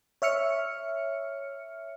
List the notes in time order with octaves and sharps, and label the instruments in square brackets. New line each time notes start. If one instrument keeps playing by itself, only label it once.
[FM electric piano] C#5 E5 F6 C#7